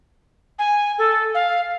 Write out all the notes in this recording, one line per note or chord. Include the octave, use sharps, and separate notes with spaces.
G#5
A4
F5